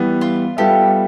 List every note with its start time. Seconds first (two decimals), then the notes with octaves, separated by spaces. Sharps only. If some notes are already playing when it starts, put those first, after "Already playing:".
Already playing: E3 G3 B3
0.21 F4
0.57 G3 B3 F4 G4 A4 E5